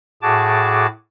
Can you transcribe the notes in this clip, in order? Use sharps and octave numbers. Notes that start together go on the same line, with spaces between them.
A2 F#4 G#4 A5 D6